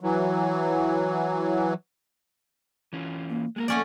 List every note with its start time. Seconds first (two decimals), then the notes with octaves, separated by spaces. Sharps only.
0.01 E3 F#3
2.93 E3 C#4 F4
3.30 A#3
3.56 G#3 A#3 G#4 A#4
3.68 F2 A3 C#4 F4 D5 F#5